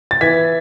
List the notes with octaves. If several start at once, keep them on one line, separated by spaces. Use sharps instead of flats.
A6
E3 G#6 B6